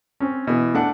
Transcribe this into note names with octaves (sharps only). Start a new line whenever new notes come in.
C4 C#4
B2 E3
A3 D4 F#5